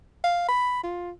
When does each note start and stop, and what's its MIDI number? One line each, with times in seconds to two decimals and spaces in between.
0.24 0.45 77
0.48 0.83 83
0.83 1.11 65